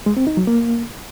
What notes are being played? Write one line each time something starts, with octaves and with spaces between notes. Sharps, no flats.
G#3
C4
D#4
F#3
A#3